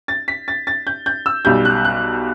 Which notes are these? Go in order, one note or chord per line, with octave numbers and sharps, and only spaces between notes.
A6
B6
A6
A6
G6
G6
E6
B1 B2 G3 G6
F#6
F#6